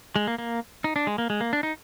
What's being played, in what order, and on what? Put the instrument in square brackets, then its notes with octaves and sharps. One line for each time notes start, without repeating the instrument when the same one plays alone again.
[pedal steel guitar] G#3
A#3
A#3
D#4
D4
G#3
A#3
G#3
A#3
D4
D#4